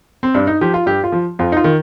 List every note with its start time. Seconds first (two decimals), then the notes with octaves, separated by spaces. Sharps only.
0.23 C4
0.34 G2 D4
0.47 D#4
0.61 F3 G4
0.74 F4
0.86 G2 G4
1.04 F4
1.12 F3
1.39 F2 F4
1.52 D#4
1.57 F4
1.64 D#3